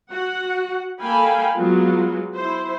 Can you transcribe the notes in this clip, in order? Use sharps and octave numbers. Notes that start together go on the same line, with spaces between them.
F#4 F#5
A#3 A4 F5 G5 G#5 B5
F#3 G#3 B3 F4
E4 C5